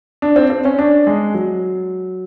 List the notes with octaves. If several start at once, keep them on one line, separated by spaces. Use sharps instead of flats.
D4
C4
C4
C#4
D4
G#3
F#3